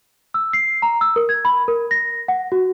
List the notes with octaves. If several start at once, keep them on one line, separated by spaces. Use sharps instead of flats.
E6
C7
A#5
E6
A#4
G#6
B5
A#4
A#6
F#5
F#4